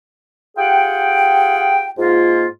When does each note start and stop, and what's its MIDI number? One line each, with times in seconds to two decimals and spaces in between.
0.57 1.90 65
0.57 1.90 67
0.57 1.90 68
0.57 1.90 78
0.57 1.90 79
1.98 2.46 44
1.98 2.46 58
1.98 2.46 65